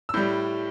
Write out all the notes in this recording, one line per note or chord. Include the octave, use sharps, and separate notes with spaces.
E6
A2 G3 G6